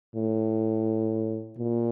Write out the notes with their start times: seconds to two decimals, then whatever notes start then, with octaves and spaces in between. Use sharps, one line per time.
0.16 A2
1.58 A#2